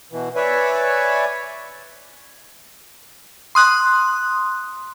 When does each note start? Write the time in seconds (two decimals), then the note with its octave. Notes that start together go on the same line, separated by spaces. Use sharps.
0.12 B2 E3
0.36 B4 C#5 D5 E5 G#5
3.55 C6 D#6 F#6